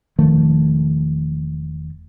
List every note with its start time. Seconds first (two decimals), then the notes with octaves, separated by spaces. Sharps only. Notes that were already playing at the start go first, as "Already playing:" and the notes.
0.19 E1 D#3 F3 A3